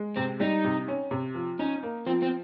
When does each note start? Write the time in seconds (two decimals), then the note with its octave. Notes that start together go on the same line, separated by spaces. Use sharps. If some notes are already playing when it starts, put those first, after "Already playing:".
Already playing: G#3
0.16 C3 C4
0.40 G3 D#4
0.64 C3
0.88 C#4
1.11 C3
1.34 F3
1.59 C#4 D#4
1.83 A#3
2.06 F3 C4
2.22 C4